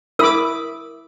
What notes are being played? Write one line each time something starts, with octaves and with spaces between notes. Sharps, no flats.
E4 A#4 B5 D6 E6